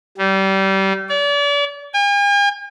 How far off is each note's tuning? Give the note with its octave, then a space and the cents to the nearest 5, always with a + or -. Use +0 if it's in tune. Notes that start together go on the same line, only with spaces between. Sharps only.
G3 -25
D5 -40
G#5 -45